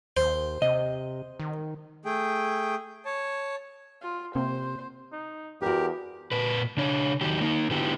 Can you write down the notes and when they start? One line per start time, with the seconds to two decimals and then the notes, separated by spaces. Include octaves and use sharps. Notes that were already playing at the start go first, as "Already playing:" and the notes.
0.17 D#2 C5
0.62 C3 D#5
1.40 D#3
2.05 A3 G#4 G5
3.05 C#5 A5
4.02 F4
4.35 C3 A#3 C4 C5
5.13 D#4
5.62 E2 D#4 F#4 G4 A#4
6.31 A#2 B4
6.77 C#3 D4 C#5
7.21 D#3 F#3 G4
7.41 A#3 D#4
7.71 D3 B3 E4 F#4 G4